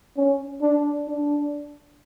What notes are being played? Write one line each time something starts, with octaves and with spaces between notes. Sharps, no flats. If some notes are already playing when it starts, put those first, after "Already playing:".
C#4
D4
D4